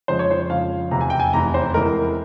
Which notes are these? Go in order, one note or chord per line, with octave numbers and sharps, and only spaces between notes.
F2 C#3 F3 G#3 C5
C#5
C5
F2 C#3 F3 G#3 F5
F1 E2 C3 A#5
G#5
G5
G#5
F1 E2 C3 A#5
C5
E2 C3 E3 G#3 A#4